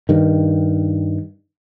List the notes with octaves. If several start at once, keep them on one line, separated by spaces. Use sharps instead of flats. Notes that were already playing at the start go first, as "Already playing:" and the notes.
G2 D#3